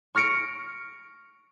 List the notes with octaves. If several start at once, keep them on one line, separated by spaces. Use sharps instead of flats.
C#6 F6 A#6 C#7 D7